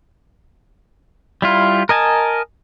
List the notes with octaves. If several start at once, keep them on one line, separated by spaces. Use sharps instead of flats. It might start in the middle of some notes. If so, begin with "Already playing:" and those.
G3 E4 F4
A#4 D#5 G#5 A5